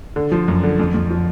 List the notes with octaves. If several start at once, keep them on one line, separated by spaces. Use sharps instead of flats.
D3
F3
F#2
D3
F2
F2
F3